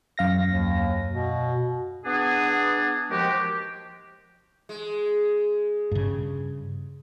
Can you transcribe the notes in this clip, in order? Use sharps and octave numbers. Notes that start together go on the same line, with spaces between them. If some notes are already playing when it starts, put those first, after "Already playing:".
F#2 F5 A#6
D#2
B2
B3 D4 G#4
D#2 F3 G#3 F#4 G4
G#3
G2 C#3